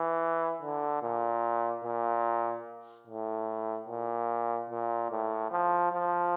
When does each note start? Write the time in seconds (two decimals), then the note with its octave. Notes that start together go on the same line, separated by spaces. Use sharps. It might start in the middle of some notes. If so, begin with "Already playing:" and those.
Already playing: E3
0.62 D3
1.02 A#2
1.84 A#2
3.07 A2
3.88 A#2
4.70 A#2
5.11 A2
5.51 F3
5.93 F3